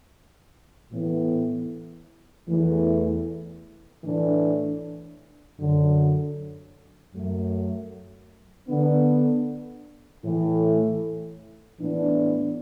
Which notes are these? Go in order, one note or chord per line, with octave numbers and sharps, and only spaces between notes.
A2 E3 B3
E2 E3 A3
A2 E3 A3 D4
F#2 D3 F#3
F#2 F#3 A3
D3 B3 D4
A2 E3 A3
A2 E3 B3 D4